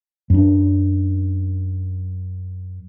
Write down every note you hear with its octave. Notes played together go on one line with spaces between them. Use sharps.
F#2 D4